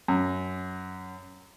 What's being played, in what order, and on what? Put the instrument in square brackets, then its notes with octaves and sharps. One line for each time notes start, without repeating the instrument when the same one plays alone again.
[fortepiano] F#2